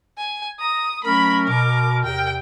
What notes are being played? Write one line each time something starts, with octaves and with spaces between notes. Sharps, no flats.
G#5
A#5 D#6
F#3 A3 C#4 A#4 B5
B2 D6
E2 C3 G5